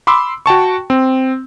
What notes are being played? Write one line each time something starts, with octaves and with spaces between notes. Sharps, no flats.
B5 C6 D6 E6
F#4 G5 A5 C#6
C4